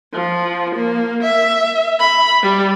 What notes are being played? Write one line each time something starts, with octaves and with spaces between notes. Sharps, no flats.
F3
A#3
E5
B5
G3